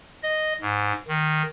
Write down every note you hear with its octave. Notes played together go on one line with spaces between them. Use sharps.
D#5
G#2
D#3